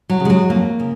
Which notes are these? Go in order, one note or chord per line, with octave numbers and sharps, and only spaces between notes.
F#3
C#3
G#3
F#3
F2 A#3
C#3